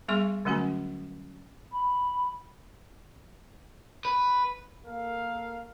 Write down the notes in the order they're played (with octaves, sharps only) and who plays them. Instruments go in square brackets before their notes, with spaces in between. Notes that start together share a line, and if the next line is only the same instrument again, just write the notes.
[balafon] G3 B3 G#4 E5 C6 C#6
D3 F#3 A3 C#4 F#4 G#5
[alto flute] B5
[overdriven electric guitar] B4
[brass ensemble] A#3 A4 A#4 F5